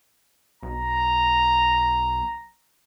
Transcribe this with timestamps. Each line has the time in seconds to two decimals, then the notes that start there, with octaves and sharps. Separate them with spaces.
0.63 B1 A#5